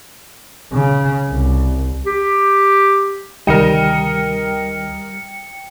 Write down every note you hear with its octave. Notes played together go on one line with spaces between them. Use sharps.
C#3
C2
G4
D2 C3 D#3 G3 A#4 D#5 G5 C#7